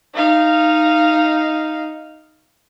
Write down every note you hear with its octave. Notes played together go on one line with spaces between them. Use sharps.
D#4 F5